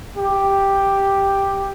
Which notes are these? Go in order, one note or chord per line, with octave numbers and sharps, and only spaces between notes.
G4